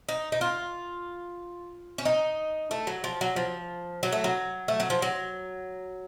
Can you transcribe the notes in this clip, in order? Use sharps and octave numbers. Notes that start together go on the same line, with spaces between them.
D#4
D#4
F4
C#4
D#4
A3
F#3
F3
F#3
F3
F#3
A3
F#3
A3
F#3
F3
F#3